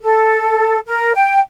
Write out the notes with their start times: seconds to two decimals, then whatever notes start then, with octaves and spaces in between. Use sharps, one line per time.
0.03 A4
0.87 A#4
1.15 G5